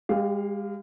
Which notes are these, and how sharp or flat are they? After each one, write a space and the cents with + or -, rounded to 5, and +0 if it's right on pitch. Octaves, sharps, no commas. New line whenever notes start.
G#3 -35 G4 +0 F5 +0